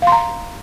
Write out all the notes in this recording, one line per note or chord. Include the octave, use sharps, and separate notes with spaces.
F5 A#5 C6